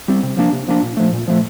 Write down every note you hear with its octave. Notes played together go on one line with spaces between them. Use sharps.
G3 C4
C3
F3 A#3 D4
C3
F3 A#3 D4
A#2
F3 A3
A#2
F3 A3